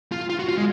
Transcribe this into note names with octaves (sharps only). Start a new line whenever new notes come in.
F4
F4
F#4
F4
G#3